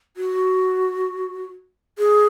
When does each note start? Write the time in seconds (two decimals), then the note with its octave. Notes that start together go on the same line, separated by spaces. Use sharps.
0.17 F#4
1.99 G#4